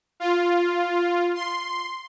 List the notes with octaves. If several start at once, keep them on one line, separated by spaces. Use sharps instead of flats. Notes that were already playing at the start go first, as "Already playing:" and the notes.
F4
C6